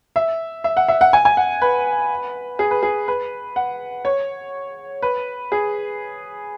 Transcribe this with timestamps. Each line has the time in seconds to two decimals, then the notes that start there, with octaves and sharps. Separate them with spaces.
0.16 E5
0.64 E5
0.77 F#5
0.88 E5
1.01 F#5
1.13 G#5
1.25 G#5
1.37 F#5
1.62 B4
2.59 G#4
2.71 B4
2.83 G#4
3.08 B4
3.56 F#5
4.05 C#5
5.02 B4
5.52 G#4